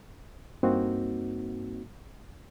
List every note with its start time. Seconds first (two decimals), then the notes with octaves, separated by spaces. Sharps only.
0.63 G2 A#3 C4 D#4 F#4